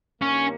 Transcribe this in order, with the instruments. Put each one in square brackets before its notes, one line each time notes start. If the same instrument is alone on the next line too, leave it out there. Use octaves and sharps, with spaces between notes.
[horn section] G2 D#3 A#3 [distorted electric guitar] C#4